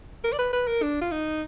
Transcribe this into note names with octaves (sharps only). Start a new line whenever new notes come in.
A#4
D5
B4
B4
A#4
D4
F4
D#4